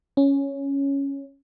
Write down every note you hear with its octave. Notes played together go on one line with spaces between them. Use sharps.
C#4